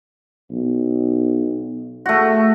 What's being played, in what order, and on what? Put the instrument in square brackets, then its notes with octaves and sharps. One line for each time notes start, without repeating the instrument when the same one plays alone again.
[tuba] B1
[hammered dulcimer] A3 F#4